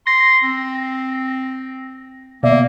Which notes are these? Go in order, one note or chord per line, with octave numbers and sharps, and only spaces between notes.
C6 A#6
C4
B2 A#3 D5 E5